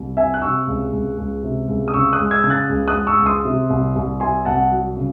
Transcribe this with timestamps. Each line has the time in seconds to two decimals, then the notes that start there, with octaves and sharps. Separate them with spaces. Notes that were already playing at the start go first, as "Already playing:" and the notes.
Already playing: C2
0.17 C3 E5 G#5
0.34 F#6
0.42 C3 C#6 E6
0.67 C#2
0.92 C#2
1.18 C#2
1.43 C3
1.68 C#2
1.88 D#6
1.94 C#3 C#6 E6
2.13 D#6 F#6
2.19 G#3
2.31 E6 G#6
2.43 C#3 G#6
2.50 F#6 A6
2.69 C#2
2.88 D#6 F#6
2.95 G#3
3.07 C#6 E6
3.19 C#2
3.26 C6 D#6
3.45 C3
3.70 C2
3.96 C2
4.20 C3 G#5 C6
4.45 C2 F#5 A5
4.71 F#3
4.97 C#3